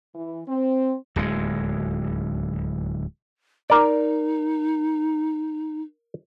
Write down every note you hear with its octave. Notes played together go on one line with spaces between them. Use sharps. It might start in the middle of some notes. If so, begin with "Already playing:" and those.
E3
C4
D1 D#2 G#3
D#4 A#4 D5